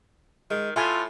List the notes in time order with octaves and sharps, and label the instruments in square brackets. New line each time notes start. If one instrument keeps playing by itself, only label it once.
[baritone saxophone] D#3 [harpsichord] G#3
[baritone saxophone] A2 [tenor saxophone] F4 [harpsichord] A4 [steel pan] E5 G#5 C6